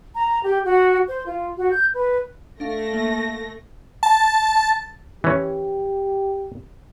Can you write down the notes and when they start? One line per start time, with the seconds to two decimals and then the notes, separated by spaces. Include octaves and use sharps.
0.14 A#5
0.43 G4
0.65 F#4
1.06 C5
1.25 F4
1.55 F#4
1.70 G6
1.93 B4
2.60 A3 D4 F5 A#6
2.93 A#3
4.03 A5
5.24 E3 C#4 G4